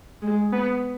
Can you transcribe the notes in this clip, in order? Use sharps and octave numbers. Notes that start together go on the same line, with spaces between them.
G#3
B3